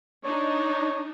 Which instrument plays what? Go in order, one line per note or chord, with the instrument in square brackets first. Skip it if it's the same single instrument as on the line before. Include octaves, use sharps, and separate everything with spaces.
[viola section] D4 D#4 [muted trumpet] C#5